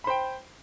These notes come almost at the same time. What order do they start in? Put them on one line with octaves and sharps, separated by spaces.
B5 C5 G5